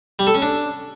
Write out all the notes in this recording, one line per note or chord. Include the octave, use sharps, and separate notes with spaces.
G3
A4
C#4
D4